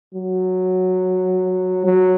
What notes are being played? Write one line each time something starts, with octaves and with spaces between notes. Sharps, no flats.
F#3
F#3